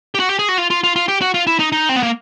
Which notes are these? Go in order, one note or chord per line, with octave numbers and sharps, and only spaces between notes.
G4
F#4
G4
G#4
F#4
F4
F4
F4
F4
G4
F#4
F4
E4
D#4
D#4
C4
B3
A#3